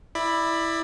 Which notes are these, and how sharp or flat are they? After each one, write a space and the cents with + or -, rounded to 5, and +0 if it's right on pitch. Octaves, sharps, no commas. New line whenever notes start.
E4 +0 D5 +20 B5 +0